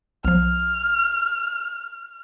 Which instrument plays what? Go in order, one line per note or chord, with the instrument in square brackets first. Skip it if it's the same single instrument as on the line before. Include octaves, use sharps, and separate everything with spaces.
[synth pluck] B1 F3 [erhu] F6